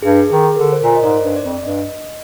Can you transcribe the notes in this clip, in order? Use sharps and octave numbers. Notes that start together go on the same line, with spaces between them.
G2 G#4
D#3 G#4
D3 A#4
C5
A#2 A#4
D#5
G#2 D5
C5
G2
D5
F2
G2 D#5